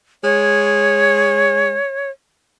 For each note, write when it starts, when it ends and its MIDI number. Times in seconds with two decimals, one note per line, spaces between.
0.24 1.76 56
0.24 2.10 73